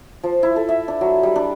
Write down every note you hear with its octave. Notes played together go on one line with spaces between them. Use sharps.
F3
E4
A4
E5
D4
F#3
G3
D4